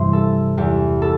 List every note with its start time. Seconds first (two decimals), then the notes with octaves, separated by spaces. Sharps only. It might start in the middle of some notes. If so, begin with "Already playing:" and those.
Already playing: G2 C3 E3 C5
0.13 A4
0.57 E2 E3 G4
1.02 A4